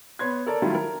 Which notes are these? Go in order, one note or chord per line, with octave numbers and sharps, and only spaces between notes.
B3 C#5 C6 G#6
A4 A#4 D5 A5
D#3 F#3 G3 A3 E4 F4
A#4